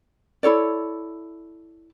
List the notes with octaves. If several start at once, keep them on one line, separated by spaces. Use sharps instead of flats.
E4 A4 C#5 D5